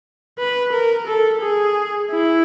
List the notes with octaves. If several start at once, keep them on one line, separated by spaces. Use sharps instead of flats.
B4
A#4
A4
G#4
E4